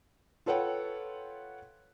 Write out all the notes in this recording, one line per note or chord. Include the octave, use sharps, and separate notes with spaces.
F4 A4 B4 C#5 F#5 G5